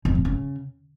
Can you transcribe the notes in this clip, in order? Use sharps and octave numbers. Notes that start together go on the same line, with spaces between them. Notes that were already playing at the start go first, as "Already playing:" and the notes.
F2
A2
C#3